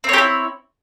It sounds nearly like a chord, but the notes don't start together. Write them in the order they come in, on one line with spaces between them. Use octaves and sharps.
C4 C#5 G4 E4